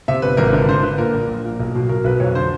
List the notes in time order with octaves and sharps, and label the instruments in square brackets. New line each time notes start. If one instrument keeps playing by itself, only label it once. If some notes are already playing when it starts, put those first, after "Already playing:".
[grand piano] C3 E5
G1 B4
G#1 A#4
B4
D3 A#4
D3 C5
D3 B4
A#2 A#4
A#1
A#1
A#2
B1
B2
B2 A#4
B1 B4
F2 C#5
D3 C5